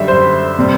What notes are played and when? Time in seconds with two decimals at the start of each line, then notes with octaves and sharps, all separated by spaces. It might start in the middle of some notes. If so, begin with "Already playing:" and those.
Already playing: F#2 D3 G3 E5
0.08 C5
0.59 C3 G3